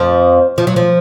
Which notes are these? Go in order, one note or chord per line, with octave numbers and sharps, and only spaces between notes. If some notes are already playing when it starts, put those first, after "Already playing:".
Already playing: F2 F3
F3
F#3
F3